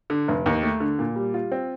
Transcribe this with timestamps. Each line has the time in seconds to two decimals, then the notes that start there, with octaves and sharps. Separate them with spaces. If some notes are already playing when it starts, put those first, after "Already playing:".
0.10 D3
0.28 F1
0.46 D#2
0.63 A3
0.80 D3
0.99 A#2
1.16 G3
1.34 F4
1.52 C4